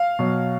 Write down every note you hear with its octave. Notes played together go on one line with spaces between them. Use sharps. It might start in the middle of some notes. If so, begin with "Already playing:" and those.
Already playing: F5
B2 F#3